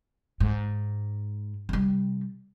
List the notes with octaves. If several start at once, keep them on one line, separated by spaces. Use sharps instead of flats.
G#2
C3 G3